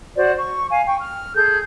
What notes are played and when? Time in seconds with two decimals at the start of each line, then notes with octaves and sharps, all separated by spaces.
0.17 F#4 C5 D5
0.37 C#6
0.71 F5 G#5
0.87 G5 C#6
1.00 F6
1.35 G#4 A4 G6